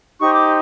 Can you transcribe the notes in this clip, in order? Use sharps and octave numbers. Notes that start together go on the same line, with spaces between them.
D#4 G4 C5 C#6
D6